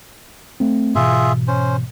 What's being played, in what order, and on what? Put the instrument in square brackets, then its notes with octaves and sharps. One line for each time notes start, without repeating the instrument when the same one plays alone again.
[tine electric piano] A3 C4
[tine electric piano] G#2 B2 E3 [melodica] F4 G#4 E5
[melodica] C#4 C5